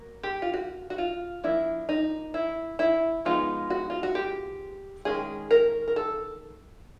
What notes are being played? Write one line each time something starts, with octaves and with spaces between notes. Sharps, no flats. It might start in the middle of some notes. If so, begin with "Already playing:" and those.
Already playing: F#3 A#3
G4
F4
F#4
F#4
F4
F3 A#3 D4 E4
D#4
E4
E4
F3 G#3 B3 D#4 F4
F#4
F4
F#4
G4
D#3 G#3 C#4 G#4
A#4
A#4
A4